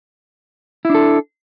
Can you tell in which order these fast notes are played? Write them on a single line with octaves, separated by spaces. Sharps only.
E4 D4 A4